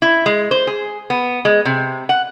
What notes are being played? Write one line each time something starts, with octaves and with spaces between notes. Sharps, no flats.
E4
G#3
C5
G#4
B3
G#3
C3
F#5